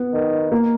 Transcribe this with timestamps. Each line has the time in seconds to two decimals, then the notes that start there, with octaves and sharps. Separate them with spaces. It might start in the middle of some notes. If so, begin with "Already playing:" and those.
Already playing: B3
0.13 D#3
0.52 A#3